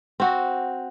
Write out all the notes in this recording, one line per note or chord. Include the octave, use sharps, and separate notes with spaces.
C4 F#4